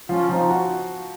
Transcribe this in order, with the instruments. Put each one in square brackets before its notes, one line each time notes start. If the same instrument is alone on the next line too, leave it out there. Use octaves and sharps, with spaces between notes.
[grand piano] F3 [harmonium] C#4 F4
[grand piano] F3 [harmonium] C4 D#4
[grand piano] F#4